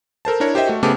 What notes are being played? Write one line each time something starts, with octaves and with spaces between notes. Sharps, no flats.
A4 A#4 C5 A5
D4 E4 A#4 C#5
G4 C5 D#5 E5 G5
A3 F#4
C#3 A3 B3 G4 A5 D6